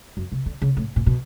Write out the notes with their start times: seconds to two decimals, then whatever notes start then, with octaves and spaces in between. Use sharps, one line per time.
0.17 F#2
0.32 C3
0.46 D3
0.62 C#3
0.77 A2
0.96 A#2
1.06 B2